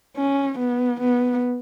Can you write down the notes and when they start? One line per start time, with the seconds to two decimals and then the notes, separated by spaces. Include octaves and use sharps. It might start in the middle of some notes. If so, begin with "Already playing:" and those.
0.17 C#4
0.59 B3
1.01 B3